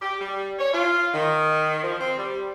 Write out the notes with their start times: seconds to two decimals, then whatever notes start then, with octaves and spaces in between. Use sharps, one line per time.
0.02 G4
0.21 G3
0.59 C#5
0.74 F4
1.13 D#3
1.83 F3
2.00 C4
2.17 G3